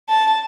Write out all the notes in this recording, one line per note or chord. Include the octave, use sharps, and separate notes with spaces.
A5